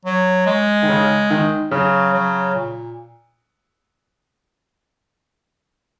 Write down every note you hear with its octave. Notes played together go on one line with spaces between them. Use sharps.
F#3
G#3
D#3
C#3
D#3
C#3 F#3
F#3
A#2